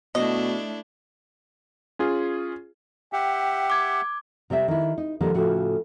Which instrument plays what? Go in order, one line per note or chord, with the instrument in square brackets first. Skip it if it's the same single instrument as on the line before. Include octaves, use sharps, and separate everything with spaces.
[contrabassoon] B2 [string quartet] A3 D4 E4 [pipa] D#5
[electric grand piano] C#4 F4 G#4
[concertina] G4 E5 F#5 [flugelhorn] G5
[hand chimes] D6 G#6
[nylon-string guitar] C3 G3 C4 E5
D#3 E4
D#4
D3 D#3 F3 G3 G#3 A#3
A2 C#3 F3 F#4 G#4